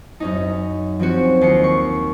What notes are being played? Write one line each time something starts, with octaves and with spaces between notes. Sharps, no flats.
F#2 C#4 D#4
F3 C4 C#4 F#4
D#2 C7 C#7
C#6